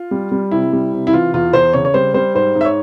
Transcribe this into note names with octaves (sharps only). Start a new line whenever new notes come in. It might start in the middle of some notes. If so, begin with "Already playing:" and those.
Already playing: F4
G3
G3
C3 E4
G3
C3
E4
E3 F4
E2 F4
E2 C5
C#3 C#5
C#5
G3 C5
G3 C5
G#2 C5
G#2
E5
C#5